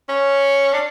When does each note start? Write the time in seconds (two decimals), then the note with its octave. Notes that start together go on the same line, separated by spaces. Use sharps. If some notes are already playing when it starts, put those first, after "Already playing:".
0.09 C#4
0.73 D4